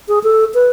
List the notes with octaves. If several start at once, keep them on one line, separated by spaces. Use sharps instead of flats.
G#4
A4
B4